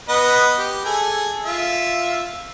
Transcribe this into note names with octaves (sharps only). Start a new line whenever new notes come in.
B3 B4 D#5
G4
G#4 A4
F4 E5